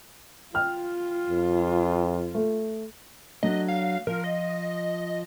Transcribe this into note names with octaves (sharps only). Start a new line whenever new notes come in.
F4 G5 F6
F2
A3
F#3 A3 D4 D#5
F5
F3 A#4
D#5